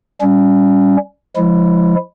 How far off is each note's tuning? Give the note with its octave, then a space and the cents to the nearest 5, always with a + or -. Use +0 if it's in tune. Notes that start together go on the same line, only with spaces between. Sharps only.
G3 +0 C#4 +15
F3 +0 G#3 +0 E4 +0